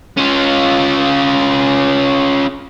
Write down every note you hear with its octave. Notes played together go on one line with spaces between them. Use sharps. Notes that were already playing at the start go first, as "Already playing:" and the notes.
C#4 F4